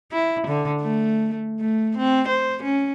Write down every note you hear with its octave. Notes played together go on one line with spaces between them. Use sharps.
E4
D3
A3
A3
C4
C5
C#4